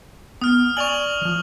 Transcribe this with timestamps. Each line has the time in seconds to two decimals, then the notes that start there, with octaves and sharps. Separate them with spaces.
0.41 B3 D#6 F6
0.77 D5 G#5 C#6 F7 F#7
1.21 E3 F3